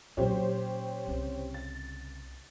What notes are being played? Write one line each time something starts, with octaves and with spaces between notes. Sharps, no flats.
A#2 F#3 C#4 G4 C5
C2 C#3
A6